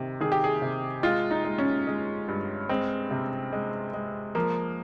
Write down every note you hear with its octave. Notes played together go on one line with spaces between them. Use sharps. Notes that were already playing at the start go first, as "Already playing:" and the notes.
Already playing: C3 D#3
D#3 G#4
G4
G#4
C3
G#3 F4
D#4
G#3
C#4
G#3
G2
G#3 C4
C3
G#3
G#3
F3 A#3